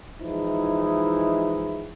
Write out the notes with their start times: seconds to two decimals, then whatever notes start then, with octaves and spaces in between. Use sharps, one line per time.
0.19 E3 F3 G#3 D#4 E4